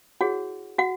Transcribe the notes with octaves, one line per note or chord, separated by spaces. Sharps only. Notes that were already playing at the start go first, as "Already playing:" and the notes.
E4 F#4 G#4 C#5 F#5
F#4 F#5